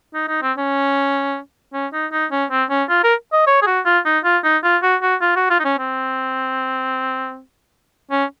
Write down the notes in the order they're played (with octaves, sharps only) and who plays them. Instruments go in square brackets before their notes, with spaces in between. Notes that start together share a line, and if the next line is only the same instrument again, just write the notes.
[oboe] D#4
D#4
C4
C#4
C#4
D#4
D#4
C#4
C4
C#4
F4
A#4
D#5
C#5
G#4
F#4
F4
D#4
F4
D#4
F4
F#4
F#4
F4
F#4
F4
D#4
C#4
C4
C#4